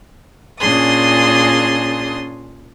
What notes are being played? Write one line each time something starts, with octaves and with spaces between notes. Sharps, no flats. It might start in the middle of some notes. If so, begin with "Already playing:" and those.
A#2 C#4 D4 G#4 C6 D#6